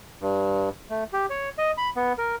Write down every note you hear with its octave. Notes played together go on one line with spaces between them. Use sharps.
G2
A3
G4
C#5
D#5
B5
B3
A#4